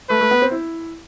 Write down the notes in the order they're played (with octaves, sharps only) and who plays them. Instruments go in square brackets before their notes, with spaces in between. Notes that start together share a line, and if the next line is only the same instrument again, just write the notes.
[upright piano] A3 [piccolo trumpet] B4
[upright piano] A3
B3
C4
E4